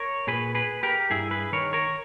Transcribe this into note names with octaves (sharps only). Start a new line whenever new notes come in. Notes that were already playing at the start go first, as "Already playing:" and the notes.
Already playing: A#4 C#5
A#2 G#4 B4
G#4 B4
G4 A#4
G2 E4 G#4
G#4 B4
D#3 A#4 C#5
A#4 C#5